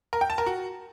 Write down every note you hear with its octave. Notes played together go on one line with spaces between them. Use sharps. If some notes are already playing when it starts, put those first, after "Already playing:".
A#4
G5
A5
A#4
F#4